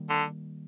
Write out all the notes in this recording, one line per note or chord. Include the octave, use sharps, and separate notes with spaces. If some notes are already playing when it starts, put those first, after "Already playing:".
Already playing: D#3 G3 A#3
D3